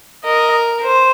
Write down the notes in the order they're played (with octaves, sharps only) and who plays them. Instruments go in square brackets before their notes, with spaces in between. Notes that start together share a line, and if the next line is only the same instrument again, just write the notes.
[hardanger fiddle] A#4 [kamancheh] D#5
[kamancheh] C5